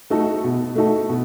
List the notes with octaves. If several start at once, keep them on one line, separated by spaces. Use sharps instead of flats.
A3 D#4 F#4 A4
B2
A3 D#4 F#4 A4
B2